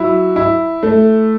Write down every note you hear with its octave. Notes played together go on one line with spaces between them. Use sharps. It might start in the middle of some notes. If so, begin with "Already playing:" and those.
Already playing: F#3 E4
E4
A3